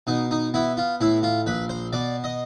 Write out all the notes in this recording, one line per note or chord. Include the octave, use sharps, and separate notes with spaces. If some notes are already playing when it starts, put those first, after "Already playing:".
B2 D#4
D#4
B3 E4
F4
A2 E4
F4
A#1 B4
C5
B2 D5
D#5